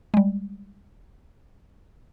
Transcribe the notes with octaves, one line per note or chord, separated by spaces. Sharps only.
G3 G#3